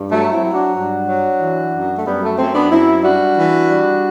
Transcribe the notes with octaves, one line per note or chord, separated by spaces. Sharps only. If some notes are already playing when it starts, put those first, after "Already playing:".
Already playing: G2
F#3 A3
C4 E4
F#3
D4 F#4
G2 D4 F#4
F#3
E3
F#2
A3
F#2 G3 B3
A3
F#2 A3 C4
B3 D4
F#2 C4 E4
G3 D4 F#4
E3
G3